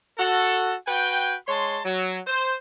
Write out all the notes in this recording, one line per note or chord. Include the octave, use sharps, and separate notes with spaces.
F#4 A4
F#4 B4 G5
G#3 C#5 A5 C6
F#3
C5